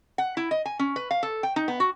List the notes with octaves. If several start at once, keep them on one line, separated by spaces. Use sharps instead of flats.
F#5
E4
D#5
G#5
C#4
B4
F5
A4
G5
D#4
B3
F#4